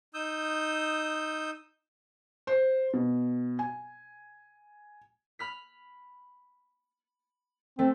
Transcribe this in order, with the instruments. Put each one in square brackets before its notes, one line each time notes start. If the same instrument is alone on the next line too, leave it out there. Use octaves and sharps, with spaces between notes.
[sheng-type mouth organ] D#4 D#6 E6 G6
[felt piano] C5
B2
G#5
[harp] B5 F6 B6
[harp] A3 [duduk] C4